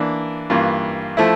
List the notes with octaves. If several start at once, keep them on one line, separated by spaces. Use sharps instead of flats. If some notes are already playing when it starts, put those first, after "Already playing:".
Already playing: E3 A#3 D4
G2 E3 A#3 F4
F3 A3 E4